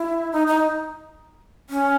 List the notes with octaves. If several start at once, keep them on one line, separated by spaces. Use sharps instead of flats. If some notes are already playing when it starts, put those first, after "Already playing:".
Already playing: E4
D#4
D#4
C#4